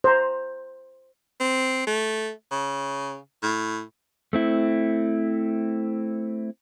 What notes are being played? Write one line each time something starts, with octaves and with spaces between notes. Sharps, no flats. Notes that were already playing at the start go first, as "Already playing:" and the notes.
C5 A#5
C4
A3
C#3
A2
A3 C4 E4